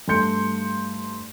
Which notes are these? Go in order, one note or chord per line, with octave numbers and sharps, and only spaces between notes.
G2 A3 C6 G6 C#7